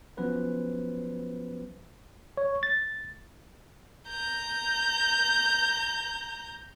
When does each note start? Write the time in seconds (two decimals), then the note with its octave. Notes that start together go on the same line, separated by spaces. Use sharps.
0.17 F3 F#3 B3 C#4 B4 C5
2.37 C#5
2.63 A6
4.09 A#5 G6